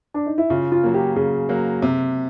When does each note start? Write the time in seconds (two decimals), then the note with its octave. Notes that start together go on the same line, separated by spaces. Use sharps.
0.14 D4
0.26 D#4
0.38 E4
0.50 C#3 F4
0.72 F4
0.83 F#3 A#3
0.94 G4
1.16 C#3 G#4
1.49 F#3 A#3
1.82 C3